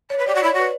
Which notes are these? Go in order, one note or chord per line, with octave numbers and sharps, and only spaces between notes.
C#5 D5
B4
G4 D5
F#4
E4 C#5
F#4
B4